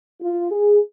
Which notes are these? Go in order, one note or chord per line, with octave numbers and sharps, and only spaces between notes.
F4
G#4